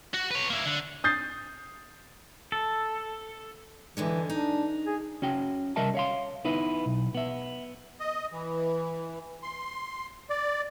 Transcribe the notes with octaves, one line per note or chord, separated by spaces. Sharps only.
F#4
B4 C#5
A#3 E4
D3
D#6 G6 A6 C7
A4
G2 D3 E3 G#3
D4 D#4
G#4
C#4 F#4 G5
C2 G3 A#4 D#5 E5 A5
C#5 F5 C6
B3 D#4 E4 B4
B1
B3 E5
D#5
E3
C6
D5